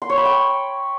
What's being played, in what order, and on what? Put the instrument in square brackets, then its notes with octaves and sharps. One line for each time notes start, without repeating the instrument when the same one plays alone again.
[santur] C6
C#5
B5
G5